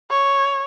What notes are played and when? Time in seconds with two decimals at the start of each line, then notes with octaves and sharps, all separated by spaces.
0.11 C#5